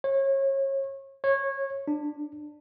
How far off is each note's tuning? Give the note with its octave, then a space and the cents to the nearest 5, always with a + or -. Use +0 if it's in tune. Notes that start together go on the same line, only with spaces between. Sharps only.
C#5 -30
C#5 -20
D4 +20